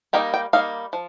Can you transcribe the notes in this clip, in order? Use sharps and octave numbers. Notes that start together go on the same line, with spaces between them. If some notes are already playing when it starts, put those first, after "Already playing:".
G3 A#3 D#4 G5
G5
G3 A#3 D#4 F5
F3